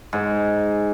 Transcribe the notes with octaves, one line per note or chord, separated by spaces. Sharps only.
G#2